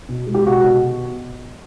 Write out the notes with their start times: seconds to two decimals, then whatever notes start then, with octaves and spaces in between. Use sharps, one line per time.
0.09 B2
0.27 G#3
0.34 G4
0.46 B2 F#4
0.64 B2